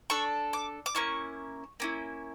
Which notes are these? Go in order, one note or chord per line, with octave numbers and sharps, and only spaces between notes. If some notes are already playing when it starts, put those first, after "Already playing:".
D4 A4 C#6
D6
D6
A#3 C#4 E4 C#6
A#3 C#4 E4